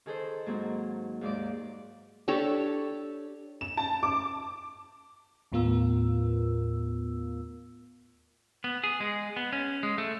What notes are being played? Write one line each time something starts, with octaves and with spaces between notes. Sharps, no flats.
D#3 G#4 A4 C5
G#2 F#3 A#3 C4
D#2 G#2 D5 D6
D4 G4 A4 C#5
E7
A5
D6
D#2 A2 B3 F4 A#4 E6
B3
G#4
G#3
B3
C#4
G#3
A3